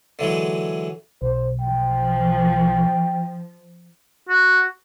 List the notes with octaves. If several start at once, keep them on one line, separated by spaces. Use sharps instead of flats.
D3 E3 F#3 G#3
B1 C5
F3 G5
F#4